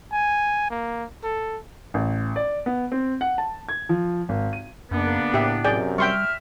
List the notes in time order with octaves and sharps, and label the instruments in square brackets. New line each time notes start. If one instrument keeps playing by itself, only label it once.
[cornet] G#5
A#3
A4
[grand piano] A1
D5
B3
C4
F#5
A5
G#6
F3
G#1
D#7
[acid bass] F#2 [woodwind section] C#3 B3 D4 [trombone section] A#3
[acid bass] A2 [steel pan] G4 E5
[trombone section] F#2 C3 [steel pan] G#4 D5 G5
[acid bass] G3 [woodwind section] E5 F6 [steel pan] G5 C6 C#6